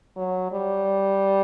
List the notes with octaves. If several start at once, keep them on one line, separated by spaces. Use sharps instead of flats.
F#3
G3